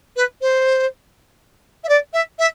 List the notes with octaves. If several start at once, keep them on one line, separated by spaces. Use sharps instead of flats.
B4
C5
E5
D5
E5
E5